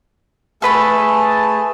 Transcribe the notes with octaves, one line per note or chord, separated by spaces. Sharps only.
A3 G#4 A4 B4 A5 B5